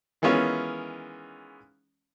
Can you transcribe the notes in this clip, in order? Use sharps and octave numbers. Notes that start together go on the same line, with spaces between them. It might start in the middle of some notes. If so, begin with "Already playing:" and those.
D#3 E3 G#3 B3 C#4 F4